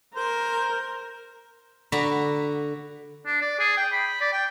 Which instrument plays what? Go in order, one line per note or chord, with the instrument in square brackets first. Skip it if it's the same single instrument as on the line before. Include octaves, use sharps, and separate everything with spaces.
[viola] A#4 [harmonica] C5
[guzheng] D3 F#4 A#5 B5
[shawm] D4
D5
G#4
G5
B5
D5
G5